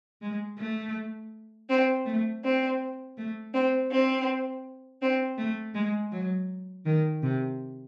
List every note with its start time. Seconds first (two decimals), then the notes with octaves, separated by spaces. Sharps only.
0.22 G#3
0.58 A3
1.69 C4
2.05 A3
2.43 C4
3.17 A3
3.54 C4
3.91 C4
5.01 C4
5.38 A3
5.74 G#3
6.12 F#3
6.85 D#3
7.22 C3